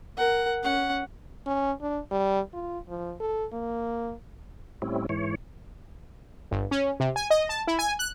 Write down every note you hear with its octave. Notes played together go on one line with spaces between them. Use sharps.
A#4 F#5
C#4 F#5
C#4
D4
G3
F4
F3
A4
A#3
A2 G3 C4 C#4 E4
G#2 E3 C#5
G1
C#4
C3
G#5
D#5
A5
E4
G#5
F#6